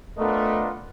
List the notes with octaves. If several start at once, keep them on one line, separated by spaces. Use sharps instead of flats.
A3 B3 D4 F4 A#4 D#5